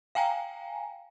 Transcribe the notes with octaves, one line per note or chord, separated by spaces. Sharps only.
F5 G5 G#5 A#5